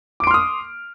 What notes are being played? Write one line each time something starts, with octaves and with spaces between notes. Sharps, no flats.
C6 D6 D#6 F6 D7